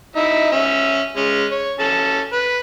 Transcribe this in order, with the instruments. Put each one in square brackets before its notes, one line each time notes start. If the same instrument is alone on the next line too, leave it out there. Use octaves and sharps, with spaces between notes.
[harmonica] D#4 E4 E5
C#4 E5
G#3 C#4
C#5
C#4 A4 A5
B4